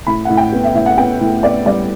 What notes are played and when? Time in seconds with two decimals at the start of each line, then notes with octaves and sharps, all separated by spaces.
0.07 A2 B5
0.25 A2 F#5
0.37 G5
0.52 B3
0.64 E5
0.74 A2 E5
0.86 F#5
0.97 B3 G5
1.20 A2
1.43 B3 D5
1.66 G3 D5